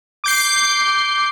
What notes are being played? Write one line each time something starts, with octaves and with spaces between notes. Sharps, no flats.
D6 G6 C7